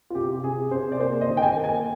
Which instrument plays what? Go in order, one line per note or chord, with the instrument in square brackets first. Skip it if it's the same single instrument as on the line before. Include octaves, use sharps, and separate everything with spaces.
[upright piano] F4
C3 G4
C3 G#4
C3 C5
D5
A#3 C5
D#5
D#3
G5
G#5
A#3
G#5